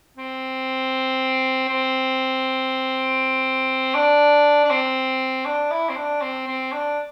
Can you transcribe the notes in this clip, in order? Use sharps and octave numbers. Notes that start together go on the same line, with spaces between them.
C4
C4
D4
D4
C4
D4
E4
C4
D4
C4
C4
D4